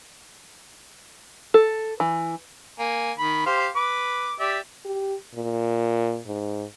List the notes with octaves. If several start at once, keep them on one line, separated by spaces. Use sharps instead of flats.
A4
E3
A#3 G#5
D#3 B5
G4 C5 F5
B4 D6
G4 D5 E5
G4
A#2
G#2